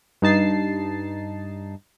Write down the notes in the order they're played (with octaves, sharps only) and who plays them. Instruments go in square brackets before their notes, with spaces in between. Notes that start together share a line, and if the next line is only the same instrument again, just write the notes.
[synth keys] G2 D#4 A5 C7